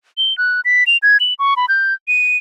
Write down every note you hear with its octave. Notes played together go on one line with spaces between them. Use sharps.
G7
F#6
B6
F7
G#6
F#7
C#6
B5
G6
D#7